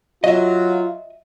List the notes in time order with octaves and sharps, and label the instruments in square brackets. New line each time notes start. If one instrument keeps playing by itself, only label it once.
[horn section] F#3 [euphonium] F4 [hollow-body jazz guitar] D#5 E5